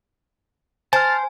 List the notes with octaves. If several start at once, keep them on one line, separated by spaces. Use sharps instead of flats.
C5 G#5 A5 F6 A6